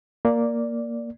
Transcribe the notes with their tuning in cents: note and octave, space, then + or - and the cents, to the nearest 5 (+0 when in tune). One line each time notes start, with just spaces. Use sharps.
A#3 +0 D5 -5